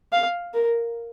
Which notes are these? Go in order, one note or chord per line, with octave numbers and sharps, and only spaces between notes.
F5
A#4